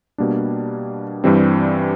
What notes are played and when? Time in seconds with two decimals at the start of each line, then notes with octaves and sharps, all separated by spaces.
0.18 B2 G3 A#3 D4
1.24 G2 E3 G3 C4